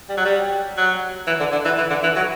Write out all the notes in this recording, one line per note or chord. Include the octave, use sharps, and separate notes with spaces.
G3
F#3
G3
F#3
E3
D3
D3
E3
E3
D3
E3
F#3